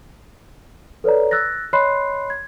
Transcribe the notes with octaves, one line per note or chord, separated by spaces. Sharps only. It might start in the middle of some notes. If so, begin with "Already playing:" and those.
A4 B4 C#5 D5 A#5
E6 F#6 A6 A#6
C#5 D#5 B5 C6 F#6 C7
G#6